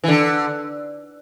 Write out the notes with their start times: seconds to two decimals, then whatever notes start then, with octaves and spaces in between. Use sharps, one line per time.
0.04 E3
0.08 D3